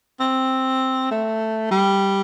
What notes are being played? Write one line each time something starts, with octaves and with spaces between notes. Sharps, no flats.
C4
A3
G3